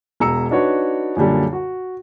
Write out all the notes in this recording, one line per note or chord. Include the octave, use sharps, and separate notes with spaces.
E1 B2 A#5 E6 C#7
D4 D#4 F#4 B4 C#5
F#2 A#2 D3 G3
F#4